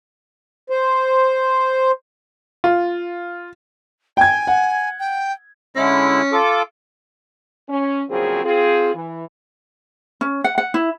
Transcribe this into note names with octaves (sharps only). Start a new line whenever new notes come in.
C5
F4
G5 G#5 G#6
F#5
G5
D3 G#3 C#4 E4
F4 A4 D6
C#4
A#2 C#3 F3 F#3 C4 G#4
C4 F4 G#4
E3
C#4
F#5
F#5
E4